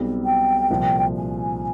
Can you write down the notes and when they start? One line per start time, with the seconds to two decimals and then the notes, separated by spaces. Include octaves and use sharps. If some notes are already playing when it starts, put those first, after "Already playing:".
Already playing: B1 B2 G3 C4
0.24 G5
0.70 C2 A#2 F3
1.16 G#5